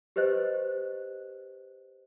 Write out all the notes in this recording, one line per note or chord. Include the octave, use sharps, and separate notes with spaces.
G4 B4 C5 D#5 F#6